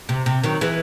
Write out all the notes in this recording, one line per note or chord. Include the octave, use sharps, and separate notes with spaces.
C3
C3
D#3 F#3
E3 G#3